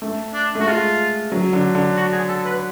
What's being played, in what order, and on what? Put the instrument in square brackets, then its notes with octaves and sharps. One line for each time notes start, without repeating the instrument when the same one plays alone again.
[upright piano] A3
[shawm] D4
[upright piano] A3 [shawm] F#4
[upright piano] G#3 [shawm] F4
[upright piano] F#3
D3
D3
[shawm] F#4
G#4
A4
B4